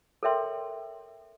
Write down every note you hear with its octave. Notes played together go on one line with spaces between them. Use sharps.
A4 A#4 C#5 E5 G5 C6